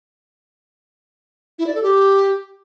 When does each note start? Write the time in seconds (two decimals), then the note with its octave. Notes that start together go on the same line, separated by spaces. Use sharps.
1.59 E4
1.67 D5
1.75 A4
1.83 G4